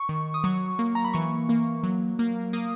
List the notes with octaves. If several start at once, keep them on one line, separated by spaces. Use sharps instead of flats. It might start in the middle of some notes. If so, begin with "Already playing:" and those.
Already playing: C#6
D#3
D#6
F#3 C#6
A#3
A#5
B5
E3 C#6
A#3
F#3
A#3
A#3 D#6